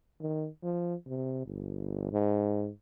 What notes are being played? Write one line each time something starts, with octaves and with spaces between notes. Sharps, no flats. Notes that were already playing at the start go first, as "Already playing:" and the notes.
D#3
F3
C3
G1
G#2